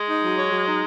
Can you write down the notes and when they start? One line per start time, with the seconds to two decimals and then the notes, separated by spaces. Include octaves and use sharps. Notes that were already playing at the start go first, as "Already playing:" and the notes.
Already playing: G#3
0.08 D#4
0.22 F#3
0.37 C#5
0.51 F#3
0.66 D#4